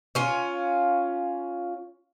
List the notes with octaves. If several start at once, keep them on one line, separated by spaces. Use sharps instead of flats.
C#4 F4